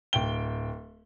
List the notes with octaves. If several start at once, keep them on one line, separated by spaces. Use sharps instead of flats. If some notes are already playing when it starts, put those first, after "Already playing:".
D1 G5 G7